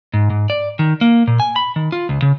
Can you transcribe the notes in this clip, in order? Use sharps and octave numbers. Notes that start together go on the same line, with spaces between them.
G#2
G#2
D5
D#3
A#3
A#2
G#5
B5
D#3
F4
C#2
C#3